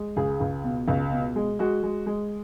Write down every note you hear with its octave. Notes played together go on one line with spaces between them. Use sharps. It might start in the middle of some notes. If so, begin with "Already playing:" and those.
Already playing: G#3
C#2 G#4
C#2
B2
C#2
B2
G#3
G#3 F#4
G#3
G#3